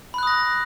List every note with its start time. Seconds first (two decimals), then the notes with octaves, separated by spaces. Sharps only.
0.14 B5
0.18 F#6
0.23 D#6
0.27 A#6